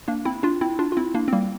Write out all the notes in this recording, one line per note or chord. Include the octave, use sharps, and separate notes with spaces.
A#3 D4
C4 E4
D4 F4
C4 E4
D4 F4
F4
C4 E4
A#3 D4
C4
G3 A#3